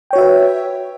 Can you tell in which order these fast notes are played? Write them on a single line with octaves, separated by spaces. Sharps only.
G5 C#5 F#4 E5 B4